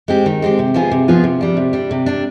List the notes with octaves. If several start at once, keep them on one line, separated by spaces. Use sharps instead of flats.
G#3 C4 G4
D#3
G#3 C4 G4
C3
F3 B3 F4 G#4
C3
F3 B3 F4 G#4
C3
G3 D4
C3
G3 D4
C3
G3 D4